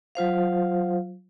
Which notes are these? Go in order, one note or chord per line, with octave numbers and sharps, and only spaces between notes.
F#3 F4 C5 F5